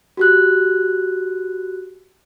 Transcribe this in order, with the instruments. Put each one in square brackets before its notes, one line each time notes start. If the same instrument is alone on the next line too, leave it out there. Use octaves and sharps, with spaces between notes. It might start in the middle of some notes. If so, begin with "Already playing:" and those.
[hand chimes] F#4 G4 F#6